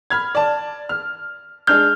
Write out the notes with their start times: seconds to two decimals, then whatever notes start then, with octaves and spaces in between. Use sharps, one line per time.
0.10 B5 F6 G#6
0.35 D5 A5
0.89 F6
1.67 G#3 D4 F6 G6